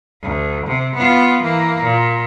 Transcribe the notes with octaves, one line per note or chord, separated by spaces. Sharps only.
D2
C3
B3 F4
E3 A#3
A#2